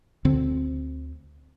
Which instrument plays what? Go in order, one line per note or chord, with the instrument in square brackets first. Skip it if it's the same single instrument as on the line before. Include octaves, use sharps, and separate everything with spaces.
[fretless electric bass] D2 D3 C4